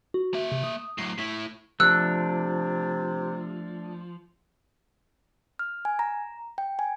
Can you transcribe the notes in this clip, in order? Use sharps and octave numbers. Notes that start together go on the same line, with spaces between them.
F#4
A#3 E5
C3
D#6
A2 F#3 C7
A2 E4 B6
C3 F3 A3 D4 E6 F#6
F6
G#5
A#5
G5
G#5